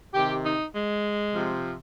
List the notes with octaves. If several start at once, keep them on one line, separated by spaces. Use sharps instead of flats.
C3 D#3 G4
D#4
G#3
C3 F3